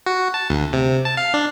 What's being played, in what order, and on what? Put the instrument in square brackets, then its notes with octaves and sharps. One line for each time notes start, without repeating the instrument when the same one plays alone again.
[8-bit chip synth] F#4
A5
D2
C3
A5
F5
D4